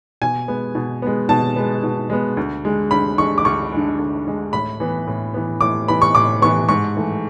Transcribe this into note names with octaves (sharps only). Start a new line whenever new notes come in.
B2 G#5
G#3 B3
B2
G#3 B3
B2 A5
G#3 B3
B2
G#3 B3
D2
D3 G#3
D2 B5
D3 G#3 C#6
D6
D2 C#6
D3 G#3
D2
D3 G#3
A2 B5
E3 B3
A2
E3 B3
A2 D6
E3 B3 B5
C#6
A2 D6
E3 B3 C#6
G#2 C#6
E3 A3